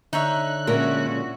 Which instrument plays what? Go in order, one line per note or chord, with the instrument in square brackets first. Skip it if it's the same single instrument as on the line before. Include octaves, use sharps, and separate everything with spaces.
[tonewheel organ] D3 F#6 [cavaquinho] D#4 C#5 E5
[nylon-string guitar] A#2 G#3 A#4 [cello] C#4 F#4 [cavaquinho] E5